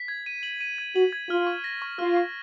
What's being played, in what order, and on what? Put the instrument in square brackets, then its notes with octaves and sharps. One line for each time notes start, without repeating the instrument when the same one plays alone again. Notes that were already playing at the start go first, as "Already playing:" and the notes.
Already playing: [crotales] B6
G#6
D#7
F#7
D#7
G#6
[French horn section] F#4 [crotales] F#7
[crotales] G#6
[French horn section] F4 [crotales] F6
[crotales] C#6
A#6
C#6
[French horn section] F4 [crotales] F6
[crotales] C#6